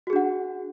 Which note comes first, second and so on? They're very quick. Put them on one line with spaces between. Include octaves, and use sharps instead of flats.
F#4 G#4 D4 F#5